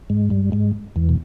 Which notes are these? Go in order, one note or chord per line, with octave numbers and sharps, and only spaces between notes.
G#2 G#3
G2 G3
G#2 G#3
E2 E3
B2